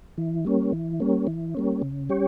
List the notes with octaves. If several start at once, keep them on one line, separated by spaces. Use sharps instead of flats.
E3
G3 A#3 C#4
E3
G3 A#3 C#4
E3
G3 A#3 C#4
C#3
G3 C#4 G4 C#5